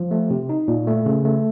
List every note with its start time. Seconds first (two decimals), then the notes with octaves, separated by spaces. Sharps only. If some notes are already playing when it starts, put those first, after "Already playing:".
Already playing: F3
0.11 A3
0.30 C3
0.49 D#4
0.68 A#2
0.87 A3
1.06 C#3
1.25 A3